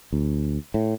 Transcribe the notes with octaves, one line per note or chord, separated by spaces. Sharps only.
D2
A2